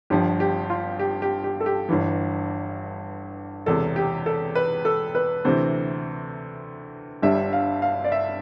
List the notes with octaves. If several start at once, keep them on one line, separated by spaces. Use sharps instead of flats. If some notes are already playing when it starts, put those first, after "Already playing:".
G1 G2 F3 G4
G4
F4
G4
G4
G4
A4
G4
G1 G2 E3
E1 E2 C3 A4
G4
A4
B4
A4
B4
D2 C3 E3 C5
G1 G2 D3 G3 E5
F5
F5
D5
E5